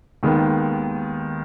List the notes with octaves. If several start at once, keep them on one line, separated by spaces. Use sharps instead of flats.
D#2 D#3 G#3 B3